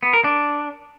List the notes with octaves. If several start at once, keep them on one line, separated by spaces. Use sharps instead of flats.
B3
A#4
D4